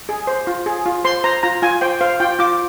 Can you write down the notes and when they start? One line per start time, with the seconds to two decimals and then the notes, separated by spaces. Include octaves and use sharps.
0.09 G#4
0.27 C5
0.47 F4
0.66 G#4
0.86 F4
1.04 C5 C6
1.24 C5 A#5
1.43 F4 A#5
1.62 F4 G#5
1.81 C5 G5
2.01 C5 F5
2.20 F4 G5
2.39 F4 D6